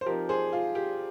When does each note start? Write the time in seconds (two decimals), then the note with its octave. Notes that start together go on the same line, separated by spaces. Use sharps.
0.01 C5
0.06 F3 C4 D#4 G4 A#4
0.29 G#4 C5
0.53 F4
0.75 G4